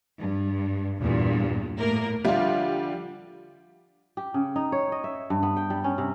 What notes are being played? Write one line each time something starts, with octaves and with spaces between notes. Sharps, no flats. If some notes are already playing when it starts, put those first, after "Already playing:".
G2
E2 G2 A#2
A2 A#3 A#4
D3 F3 G3 F4 E5
G4
C#3
D#4
C#5
D#5
E5
G2
B3
G5
G3
C#4
C3